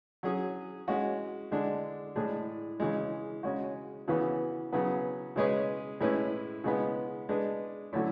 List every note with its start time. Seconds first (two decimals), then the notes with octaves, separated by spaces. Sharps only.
0.23 F#3 C#4 G#4
0.88 G#3 C#4 F#4
1.51 D3 G#3 D4
2.16 A2 G#3 D4 G#4
2.80 C#3 E3 G#3
3.43 C#3 G#3 C#4 F#4
4.08 C#3 E3 B3 F#4
4.73 C#3 F#3 B3
5.36 C#3 G#3 C#4 G#4 B4
6.00 A2 G#3 C#4 E4 B4
6.64 C#3 G#3 B3
7.29 G#3 D4 G#4 B4
7.93 D3 F#3 A3 C#4 E4